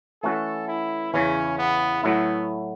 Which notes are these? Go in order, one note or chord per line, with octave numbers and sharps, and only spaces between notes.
E3 A3 C#4 F#4 A4
E4
E2 C#3 E3 C#4
B3
A2 F#3 A3 B3 E4